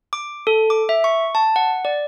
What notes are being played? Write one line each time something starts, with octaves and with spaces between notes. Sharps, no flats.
D6
A4
D6
E5
C#6
A5
F#5
D5